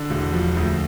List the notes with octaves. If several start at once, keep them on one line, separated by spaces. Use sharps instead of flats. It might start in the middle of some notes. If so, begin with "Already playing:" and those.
Already playing: D3
E1
F3
D2